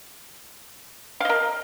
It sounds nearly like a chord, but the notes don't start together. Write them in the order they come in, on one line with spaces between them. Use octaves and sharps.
F5 D#5 A#4